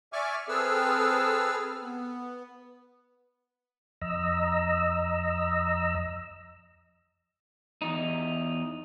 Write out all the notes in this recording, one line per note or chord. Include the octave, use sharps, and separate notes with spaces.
D5 E5 G#5 C#6 D6 F6
C4 G#4 A4 B4 E6 F6
B3
F2 D#5 A#5 E6
E2 D#4